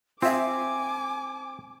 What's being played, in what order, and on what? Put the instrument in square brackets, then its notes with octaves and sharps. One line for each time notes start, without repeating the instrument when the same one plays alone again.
[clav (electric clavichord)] C4 [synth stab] F4 E5 [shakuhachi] G#5 [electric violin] D6